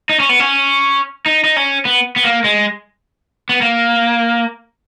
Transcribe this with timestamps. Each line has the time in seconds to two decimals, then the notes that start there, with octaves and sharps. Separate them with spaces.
0.09 D#4
0.20 C#4
0.29 B3
0.40 C#4
1.26 D#4
1.44 D#4
1.56 C#4
1.85 B3
2.16 B3
2.24 A#3
2.44 G#3
3.49 B3
3.61 A#3